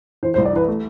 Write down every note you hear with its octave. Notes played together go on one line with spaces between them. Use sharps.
E3 C5
C5
C2
D5
E3 B4
A3